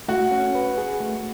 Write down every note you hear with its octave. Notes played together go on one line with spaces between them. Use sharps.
A3 F#4
C#4
B4
G#4
A3